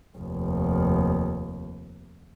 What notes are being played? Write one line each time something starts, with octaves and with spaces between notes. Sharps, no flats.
F1 D#2